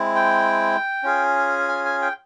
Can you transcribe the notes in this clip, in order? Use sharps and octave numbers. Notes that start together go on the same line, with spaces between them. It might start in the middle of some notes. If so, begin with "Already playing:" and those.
Already playing: G#3 C4 E4
G5
C#4 F4 G#4
G#5
G#5
G5